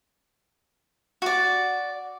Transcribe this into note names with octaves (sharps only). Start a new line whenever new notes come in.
F#4 D5